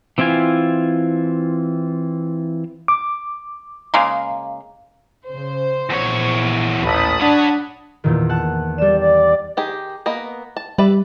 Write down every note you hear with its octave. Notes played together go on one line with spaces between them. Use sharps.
E3 C4 E4 F4 G#5
D6
C#3 G#3 A#3
C#3 C5
A#1 E2 A#2 E3 C#5
A1 D#2 A5 B5 D#6
G#2 D4 C#5 F#5
E2 A#2 D#3
F#5 A5 F#6
G3 D5 E7
D5
D#3 G4 G#4
A#3 B3 D#5
A5
G3 B4 D5 E5